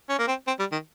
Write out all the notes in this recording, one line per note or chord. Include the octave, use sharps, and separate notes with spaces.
C#4
A#3
C4
C4
G3
D#3